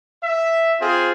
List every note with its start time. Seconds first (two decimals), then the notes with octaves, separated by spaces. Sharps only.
0.23 E5
0.80 C4 F4 G#4